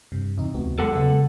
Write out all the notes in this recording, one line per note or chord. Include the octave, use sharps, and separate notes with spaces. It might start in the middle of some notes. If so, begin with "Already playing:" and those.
G2 C3
E2 C3 D#4
D2 B3 F#4
E2 F#3 G#3 A4 F#5
C#3 B3